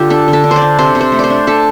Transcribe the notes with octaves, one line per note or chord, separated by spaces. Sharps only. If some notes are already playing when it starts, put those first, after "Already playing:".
Already playing: D3 F4 G4
D4 A4
D3
A4
D4
C5
D5
D4
C3 C5
C3
C5
A3
C5 D5
D4
D4 A4